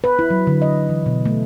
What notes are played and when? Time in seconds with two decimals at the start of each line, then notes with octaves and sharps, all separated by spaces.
0.04 B4
0.19 E4
0.30 F#3
0.47 D3
0.62 D#5
0.90 E3
1.06 B2
1.26 A3